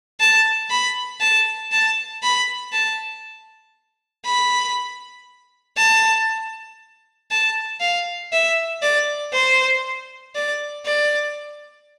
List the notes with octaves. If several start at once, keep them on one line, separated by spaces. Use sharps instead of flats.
A5
B5
A5
A5
B5
A5
B5
A5
A5
F5
E5
D5
C5
D5
D5